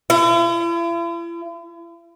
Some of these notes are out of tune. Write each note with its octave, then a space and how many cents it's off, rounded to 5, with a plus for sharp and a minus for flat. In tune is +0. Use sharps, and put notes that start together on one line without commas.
E4 +45